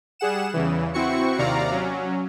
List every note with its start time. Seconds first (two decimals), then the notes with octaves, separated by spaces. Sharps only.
0.19 G3 G#4 F#5 E7
0.54 E2 C#3 E3
0.94 C4 E4 F#4 C#6 C#7
1.39 D#2 C3 D5 F5 A#5
1.71 F#3 C#4